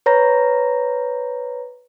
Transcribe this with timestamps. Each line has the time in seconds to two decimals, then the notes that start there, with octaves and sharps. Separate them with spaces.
0.06 B4 C#5 A#5 A#6